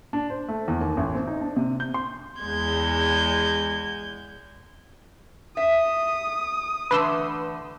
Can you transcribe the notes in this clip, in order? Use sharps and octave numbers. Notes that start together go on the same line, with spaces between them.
D4
C5
A3
E2
D#2
A1
C4
D#4
D4
C3
G6
C6
E2 G#3 G6 G#6
E5 D#6
D3 E3 A3 B4 C6 E6